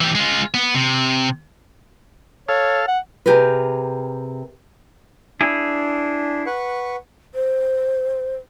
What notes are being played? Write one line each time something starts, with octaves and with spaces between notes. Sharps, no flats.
E3 G4
G#3 F4
B3
C3
A4 C#5 F5
F#5
C3 G4 G#4 A#4 B4
D4 E4 G#4
B4 F#5 C#6
C5